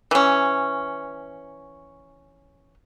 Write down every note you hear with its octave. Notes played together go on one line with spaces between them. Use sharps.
E3 C#4